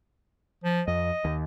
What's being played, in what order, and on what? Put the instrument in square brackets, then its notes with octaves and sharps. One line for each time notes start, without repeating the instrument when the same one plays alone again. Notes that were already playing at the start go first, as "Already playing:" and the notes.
[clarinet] F3
[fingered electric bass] F2 [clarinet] D#5
[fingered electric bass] D#2